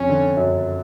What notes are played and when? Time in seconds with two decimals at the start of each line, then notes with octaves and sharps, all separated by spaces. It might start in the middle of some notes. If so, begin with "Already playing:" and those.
Already playing: F2 C#3 C#4
0.09 D3
0.37 F#2